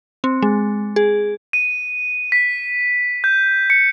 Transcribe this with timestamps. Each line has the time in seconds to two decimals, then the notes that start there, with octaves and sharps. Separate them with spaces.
0.24 C4
0.42 G#3
0.96 G#4
1.53 D#7
2.32 B6
3.24 G6
3.70 C#7